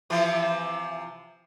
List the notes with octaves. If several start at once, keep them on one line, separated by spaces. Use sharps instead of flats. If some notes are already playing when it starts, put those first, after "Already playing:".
C3 E3 F3